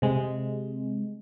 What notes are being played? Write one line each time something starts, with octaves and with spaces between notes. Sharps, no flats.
C3 G#3